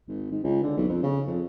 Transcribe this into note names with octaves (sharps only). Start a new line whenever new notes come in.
G#1
G#2
C#2
D3
B1
F2
C#3
F2